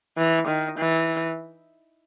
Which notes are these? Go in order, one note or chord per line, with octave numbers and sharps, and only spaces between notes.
E3
D#3
E3